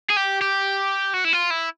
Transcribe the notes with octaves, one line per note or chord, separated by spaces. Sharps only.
G#4
G4
G4
F#4
E4
F4
E4